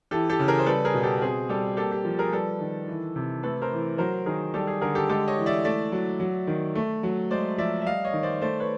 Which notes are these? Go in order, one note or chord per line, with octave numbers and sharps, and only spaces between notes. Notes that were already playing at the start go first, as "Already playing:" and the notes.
E3 G4 A4
G4 A4
C#3
G#4 A#4
C5
G3 A4 B4
G#4 A#4
B2
G4 A4
C4 G#4
G3 G4 A4
A#3 G4 A4
G4
F3
G#4 A#4
G3 A4 B4
D#3
E3
C3
A3 A4 B4
A#4 C5
E3
F#3 A#4 C5
D#3 G#4 A#4
G3 G4 A4
G#4
D3 G#4 A#4
G4 A4
G#3 G4 A4
C#5 D#5
E3
D5 E5
A3 D5 E5
F#3
F#3
D#3
A3
F#3
G#3 C5 D5
F3 D5 E5
E5
G3 D#5 F5
C#5 D#5
D#3
C5 D5
A3 C5 D5
B4 C#5